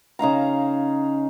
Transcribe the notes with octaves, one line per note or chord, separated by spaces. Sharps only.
C#3 D#4 F5 A#5